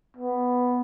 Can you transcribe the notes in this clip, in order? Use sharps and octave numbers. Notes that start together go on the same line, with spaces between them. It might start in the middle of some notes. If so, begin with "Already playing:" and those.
B3